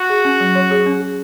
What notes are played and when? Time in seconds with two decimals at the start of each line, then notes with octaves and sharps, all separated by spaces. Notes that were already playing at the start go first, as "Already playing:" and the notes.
Already playing: F#4
0.10 G#4
0.25 C#4
0.40 F#3
0.55 C#5
0.71 G#4
0.86 C#4
1.01 G#4